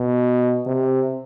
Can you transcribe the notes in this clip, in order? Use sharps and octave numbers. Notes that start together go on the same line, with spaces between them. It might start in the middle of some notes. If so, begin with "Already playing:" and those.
Already playing: B2
C3